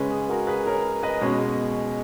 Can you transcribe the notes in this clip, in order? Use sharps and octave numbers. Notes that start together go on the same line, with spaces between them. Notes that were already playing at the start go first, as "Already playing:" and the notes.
Already playing: C#3 G#3 C#4 G#4 B4
G#4
F#4 A#4
G#4 B4
A#4 C#5
B4 D#5
B2 G#3 C#4